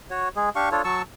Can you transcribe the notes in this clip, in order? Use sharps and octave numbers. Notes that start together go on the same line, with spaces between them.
F#4 C#5
G#3 G#4
D4 G4 F5 C#6
D4 F4 A4 C#5
F#3 A5 C#6 E6